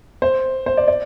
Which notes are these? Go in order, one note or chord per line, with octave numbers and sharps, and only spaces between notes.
C5
C5
D5
D5